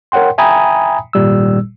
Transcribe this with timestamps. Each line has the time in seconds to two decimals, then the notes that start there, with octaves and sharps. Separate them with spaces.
0.12 A#4 C#5 F#5 G5 C6
0.38 E5 G5 G#5 A#5 B5 D#6
1.13 G#1 A#2 G3 E6